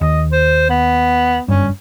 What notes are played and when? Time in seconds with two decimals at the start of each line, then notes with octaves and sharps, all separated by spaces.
0.01 D#2 D#5
0.32 C5
0.69 B3
1.48 F#1 G2 C#4